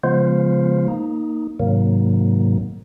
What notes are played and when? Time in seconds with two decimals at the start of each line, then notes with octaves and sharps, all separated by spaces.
0.03 C#3 F3 G#3 B3 F4 C5
0.88 A#3 D#4
1.60 G#2 C3 D#3 F#3 A#3